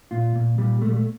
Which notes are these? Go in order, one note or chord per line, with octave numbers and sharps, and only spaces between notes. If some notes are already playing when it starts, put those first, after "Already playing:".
A#2 F4
A#2
A#2 G3
A#2 A3
G3
A3